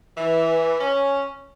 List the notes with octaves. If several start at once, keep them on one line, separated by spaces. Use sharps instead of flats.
E3
C#4